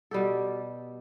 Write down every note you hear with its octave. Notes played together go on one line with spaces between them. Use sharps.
B2 G3 G4 A4